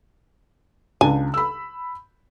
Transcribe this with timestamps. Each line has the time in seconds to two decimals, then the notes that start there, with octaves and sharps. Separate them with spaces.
1.01 C#2 D4 G#5
1.34 B5 E6